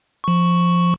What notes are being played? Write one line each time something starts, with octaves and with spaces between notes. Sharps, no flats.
F3 C#6